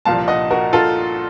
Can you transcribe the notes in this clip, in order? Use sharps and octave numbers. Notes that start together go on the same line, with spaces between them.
C2 A#2 F3 F5 A5
D#5 F#5
F#4 A#4
F4 A4